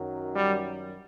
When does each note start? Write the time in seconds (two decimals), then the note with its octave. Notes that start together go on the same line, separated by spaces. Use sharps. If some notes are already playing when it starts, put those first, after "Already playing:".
Already playing: F#2 D#3 F#3
0.33 G3